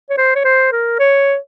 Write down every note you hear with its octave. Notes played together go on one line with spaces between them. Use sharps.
C#5
C5
C#5
C5
A#4
C#5